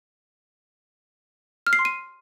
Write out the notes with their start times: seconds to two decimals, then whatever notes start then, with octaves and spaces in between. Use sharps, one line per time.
1.67 F6
1.73 C7
1.79 C6
1.85 D#7